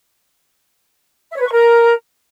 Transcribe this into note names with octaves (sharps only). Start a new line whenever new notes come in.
E5
C#5
B4
C#6
A#4